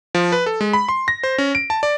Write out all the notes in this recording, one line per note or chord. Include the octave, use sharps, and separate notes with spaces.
F3
B4
A4
G#3
B5
C6
A#6
C5
C#4
D7
A5
D5